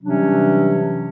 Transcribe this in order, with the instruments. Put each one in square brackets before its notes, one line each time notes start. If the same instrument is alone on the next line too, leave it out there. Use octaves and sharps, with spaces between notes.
[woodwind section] C3 E3 F#3 G3 C#4 D4